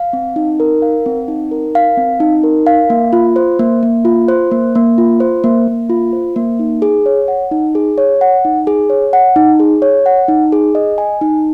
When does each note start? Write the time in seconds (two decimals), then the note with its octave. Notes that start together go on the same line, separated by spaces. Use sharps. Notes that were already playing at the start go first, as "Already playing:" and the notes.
Already playing: F5
0.13 C4
0.36 D#4
0.60 A#4
0.82 F5
1.06 C4
1.28 D#4
1.51 A#4
1.75 F5
1.97 C4
2.20 D#4
2.43 A#4
2.67 F5
2.90 A#3
3.13 F4
3.36 C5
3.59 A#3
3.83 A#3
4.05 F4
4.28 C5
4.51 A#3
4.75 A#3
4.98 F4
5.20 C5
5.44 A#3
5.68 A#3
5.90 F4
6.13 C5
6.36 A#3
6.59 D#4
6.82 G#4
7.06 C#5
7.28 F#5
7.52 D#4
7.75 G#4
7.98 C#5
8.21 F#5
8.45 D#4
8.67 G#4
8.90 C#5
9.13 F#5
9.36 D#4
9.60 G#4
9.82 C#5
10.06 F#5
10.28 D#4
10.52 G#4
10.75 D#5
10.98 G#5
11.21 D#4